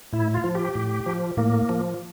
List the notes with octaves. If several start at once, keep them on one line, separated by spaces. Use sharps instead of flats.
A2 E4
F4
F3
G4
A2
F3
A2 A#3
F3